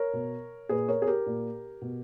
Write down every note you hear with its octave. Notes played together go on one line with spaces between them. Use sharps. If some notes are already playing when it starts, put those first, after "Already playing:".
Already playing: A#4 C#5
B2
A#2 G#4 B4
A#4 C#5
G#4
G4 A#4
A#2
B2